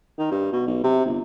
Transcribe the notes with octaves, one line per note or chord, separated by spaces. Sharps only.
D#3
G2
B2
B1
C3
G1